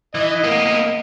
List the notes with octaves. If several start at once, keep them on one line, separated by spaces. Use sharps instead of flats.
E3 D#5
A#3 B3